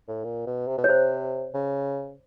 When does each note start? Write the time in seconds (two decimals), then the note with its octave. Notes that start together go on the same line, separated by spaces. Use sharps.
0.08 A2
0.24 A#2
0.47 B2
0.68 C3
0.78 B2
0.84 C#5
0.88 C3 C5
1.54 C#3